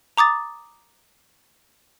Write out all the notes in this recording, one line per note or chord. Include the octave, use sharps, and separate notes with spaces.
A#5 D6 D#6 A6